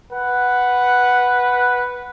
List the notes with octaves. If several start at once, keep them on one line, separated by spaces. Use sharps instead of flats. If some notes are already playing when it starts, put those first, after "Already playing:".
B4 F#5